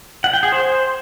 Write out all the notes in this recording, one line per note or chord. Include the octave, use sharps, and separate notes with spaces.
F#5
G5
G#4
C5